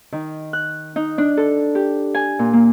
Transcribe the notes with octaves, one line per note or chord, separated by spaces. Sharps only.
D#3
F#6
D#4
D4
A4
G4
G#5
A#2
A#3